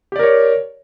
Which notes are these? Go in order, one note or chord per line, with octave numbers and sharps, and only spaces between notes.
G4 A#4 C#5 D5